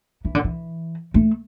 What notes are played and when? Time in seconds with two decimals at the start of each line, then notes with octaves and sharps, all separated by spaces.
0.25 E3
0.35 D3
0.44 E3
1.14 A3